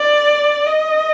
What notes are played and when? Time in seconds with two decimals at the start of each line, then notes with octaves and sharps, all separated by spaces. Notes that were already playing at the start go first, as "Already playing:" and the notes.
Already playing: D5
0.67 D#5